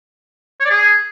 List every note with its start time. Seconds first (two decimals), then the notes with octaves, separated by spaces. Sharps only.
0.60 C#5
0.65 D5
0.70 G#4